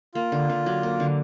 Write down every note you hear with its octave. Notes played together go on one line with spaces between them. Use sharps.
A#3 F4
D3
D3
F#3
A#3
D3